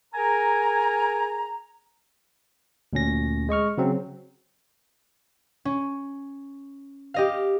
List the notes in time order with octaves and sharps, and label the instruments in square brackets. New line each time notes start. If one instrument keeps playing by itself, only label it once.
[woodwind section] G#4 A#4 G#5 A#5
[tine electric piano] D2 A#2 C#4 A#6
G#3 D#5 C#6 F6
C#3 F#3 C4
[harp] C#4
G4 D#5 F5